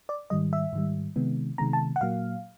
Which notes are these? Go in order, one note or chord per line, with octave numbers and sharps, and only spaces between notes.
D5
G#2 D#3 G3 D#5
E5
G#2 D#3 G3
C3 D#3 G#3 B3
C3 D#3 G#3 B3 A#5
A5
F#5
A#2 F#3 A#3 F5